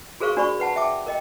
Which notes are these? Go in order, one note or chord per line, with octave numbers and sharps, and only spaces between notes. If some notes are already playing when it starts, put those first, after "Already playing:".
F#4 G#4 A#4 C5 F5 C#6
D4 F#4 C5 D5 B5 C#6
B4 F#5 A5
E5 G5 A5 D6
A#4 D#5 G5